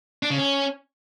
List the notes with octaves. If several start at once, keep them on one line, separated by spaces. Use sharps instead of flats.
D4
C#3
C#4